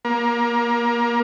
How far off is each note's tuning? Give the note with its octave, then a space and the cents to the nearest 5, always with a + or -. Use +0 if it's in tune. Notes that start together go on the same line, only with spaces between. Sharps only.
A#3 +25